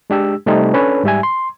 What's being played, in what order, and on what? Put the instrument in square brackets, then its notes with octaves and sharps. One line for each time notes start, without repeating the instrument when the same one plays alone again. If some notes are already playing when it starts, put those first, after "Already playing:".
[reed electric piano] G#3 D4 G4 E6
C3 G3 A3 C4 D#4
C#4 D4 A4 B4 C#5
G#2 G3 E5 G#5
C6